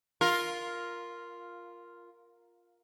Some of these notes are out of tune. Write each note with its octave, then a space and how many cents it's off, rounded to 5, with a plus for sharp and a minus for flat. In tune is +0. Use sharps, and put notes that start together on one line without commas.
F4 +0 A#4 +0